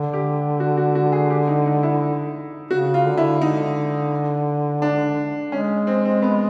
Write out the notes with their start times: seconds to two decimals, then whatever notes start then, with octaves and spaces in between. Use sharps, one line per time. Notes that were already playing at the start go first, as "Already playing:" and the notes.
Already playing: D3
0.13 G4
0.60 F#4
0.77 F#4
0.95 F#4
1.12 G#4
1.30 G4
1.48 D#4
1.66 D#4
1.83 E4
2.71 C#3 F#4
2.94 F4
3.06 D3
3.17 E4
3.41 D3 D#4
4.82 D4
5.52 G#3 C#4
5.87 C4
6.05 C4
6.22 B3